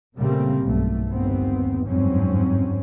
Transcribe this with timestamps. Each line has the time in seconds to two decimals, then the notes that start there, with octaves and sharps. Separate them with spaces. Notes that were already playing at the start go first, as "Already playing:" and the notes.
0.17 A#2 C#3 G3 A3 A#3 C4
0.64 B1 G2 A3
1.09 G1 D#2 B3 C4
1.88 G1 F2 G#2 F#3 C4 C#4